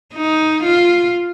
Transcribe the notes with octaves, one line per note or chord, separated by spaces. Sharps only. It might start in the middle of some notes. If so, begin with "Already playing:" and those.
D#4
F4